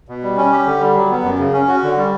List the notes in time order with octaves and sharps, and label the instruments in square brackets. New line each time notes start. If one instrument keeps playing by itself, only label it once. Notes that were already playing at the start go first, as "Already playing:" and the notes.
[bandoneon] B2
G3
C#4
G4
D3
G3
F#3
B3
F#2
C#3
C#4
F#4
D3
G3